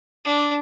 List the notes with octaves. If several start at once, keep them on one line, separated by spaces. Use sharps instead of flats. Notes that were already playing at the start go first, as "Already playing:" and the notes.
D4